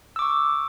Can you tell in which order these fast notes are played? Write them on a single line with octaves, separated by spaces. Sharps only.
E6 D6 C#6